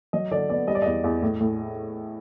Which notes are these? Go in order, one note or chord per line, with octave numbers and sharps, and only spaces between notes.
F#3 D#5
D3 D5
B3 D5
G3 D#5
D5
E2 D#5
E2
A2
A2